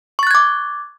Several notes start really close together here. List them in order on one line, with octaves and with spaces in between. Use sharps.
C#6 A6 F#6 G#6 D6